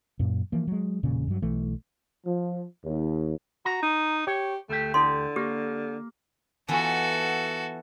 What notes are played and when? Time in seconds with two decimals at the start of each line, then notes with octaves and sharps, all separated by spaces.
0.19 F#2 A#2
0.52 E3 F3 A#3
0.67 F#3 G#3
1.03 E1 A#2 C#3
1.28 G2 F#3
1.42 B1 E3 A3
2.26 F3
2.83 D#2
3.65 F#4 A#5
3.83 D#4
4.27 G4 C#5
4.69 D2 A3 G4
4.94 D3 E4 A4 C6
5.36 A#3 G4
6.68 E3 B3 F4 F#4 A4